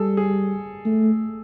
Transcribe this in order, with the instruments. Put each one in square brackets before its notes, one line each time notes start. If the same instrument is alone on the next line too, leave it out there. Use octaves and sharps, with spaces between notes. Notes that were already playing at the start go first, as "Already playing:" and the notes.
Already playing: [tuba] G3 [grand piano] G#4 A4
[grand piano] G#4
[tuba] A3